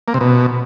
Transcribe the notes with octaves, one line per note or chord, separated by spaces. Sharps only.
A#3
C3
B2